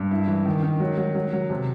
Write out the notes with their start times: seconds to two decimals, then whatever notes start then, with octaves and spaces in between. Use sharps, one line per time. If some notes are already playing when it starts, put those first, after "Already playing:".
Already playing: G2
0.11 E4
0.28 E3
0.45 D#3
0.63 D#3
0.80 F#3
0.97 F#3
1.15 F#3
1.33 F#3
1.50 C3